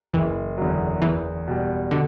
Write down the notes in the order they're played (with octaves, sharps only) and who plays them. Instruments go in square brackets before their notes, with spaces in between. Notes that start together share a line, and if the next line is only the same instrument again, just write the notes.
[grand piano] F#1 [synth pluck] E3
[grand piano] E2 D3 F#3
[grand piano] E2 [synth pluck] E3
[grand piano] B2 G3
[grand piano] B2 [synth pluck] D3